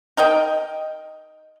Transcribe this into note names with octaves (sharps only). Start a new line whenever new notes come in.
D#4 A#4 D#5 G5